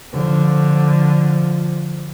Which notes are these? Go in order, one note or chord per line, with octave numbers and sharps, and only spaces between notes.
D3 F3